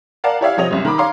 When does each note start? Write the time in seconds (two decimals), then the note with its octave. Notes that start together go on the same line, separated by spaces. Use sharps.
0.24 A#4 D5 F5 F#5 A5
0.41 E4 G4 C#5 D5 E5 F5
0.57 C3 F3 C#5 D#5 F7
0.71 C2 F#2
0.85 D#3 A#5 B5 D6
0.98 C#5 F5 A#5 C6 D6